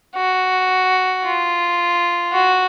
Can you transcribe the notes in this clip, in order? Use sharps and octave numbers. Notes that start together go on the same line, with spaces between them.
F#4
F4
F#4